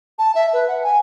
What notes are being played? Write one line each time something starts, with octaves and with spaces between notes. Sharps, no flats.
A5
E5
B4
F#5
G#5